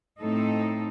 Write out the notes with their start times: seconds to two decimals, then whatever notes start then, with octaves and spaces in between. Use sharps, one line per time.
0.21 A2 A3 C4 D#4 A4